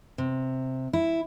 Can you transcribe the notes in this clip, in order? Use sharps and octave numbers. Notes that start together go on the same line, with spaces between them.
C3
E4